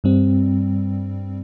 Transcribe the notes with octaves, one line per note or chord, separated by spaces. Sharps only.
G2 G3 C4